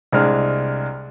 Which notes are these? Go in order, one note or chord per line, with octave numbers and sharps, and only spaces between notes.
C2 G#3 D4 F6